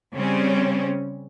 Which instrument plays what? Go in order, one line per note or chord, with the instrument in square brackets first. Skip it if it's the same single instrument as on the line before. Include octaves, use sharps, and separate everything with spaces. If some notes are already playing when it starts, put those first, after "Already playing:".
[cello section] C#3 G3 C4 C#4